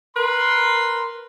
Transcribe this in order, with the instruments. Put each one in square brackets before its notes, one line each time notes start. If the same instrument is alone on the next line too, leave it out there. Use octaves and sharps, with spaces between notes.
[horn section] A#4 B4 C6